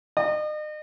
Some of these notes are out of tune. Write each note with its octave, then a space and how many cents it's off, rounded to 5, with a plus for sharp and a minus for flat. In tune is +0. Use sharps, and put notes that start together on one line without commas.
D#5 -40